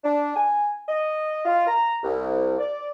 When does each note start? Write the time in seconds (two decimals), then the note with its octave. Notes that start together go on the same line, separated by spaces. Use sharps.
0.04 D4
0.36 G#5
0.89 D#5
1.46 F4
1.67 A#5
2.04 C2
2.59 D5